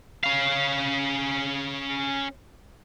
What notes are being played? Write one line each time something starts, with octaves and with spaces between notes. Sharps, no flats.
C#4 F5